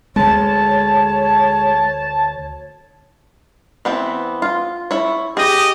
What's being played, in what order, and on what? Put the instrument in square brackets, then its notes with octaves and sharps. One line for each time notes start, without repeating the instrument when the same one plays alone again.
[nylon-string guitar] D2 [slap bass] G#3 [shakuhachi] C#5 [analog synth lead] A5
[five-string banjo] E3 B3 C4
F4
E4 C#5
[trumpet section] G4 D#5 [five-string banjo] G#4